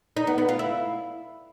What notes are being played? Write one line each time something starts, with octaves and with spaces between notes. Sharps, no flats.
D#4
B3
B3
F4
E4